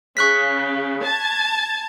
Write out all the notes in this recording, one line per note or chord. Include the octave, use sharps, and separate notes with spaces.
C#3 C#6 F#6 B6
A5 G#6